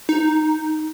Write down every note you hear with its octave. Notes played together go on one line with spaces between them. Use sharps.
D#4